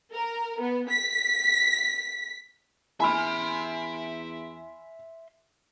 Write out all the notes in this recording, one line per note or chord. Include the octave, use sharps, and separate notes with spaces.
A#4
B3
B6
E2 E5 G#5 B5 C6 F6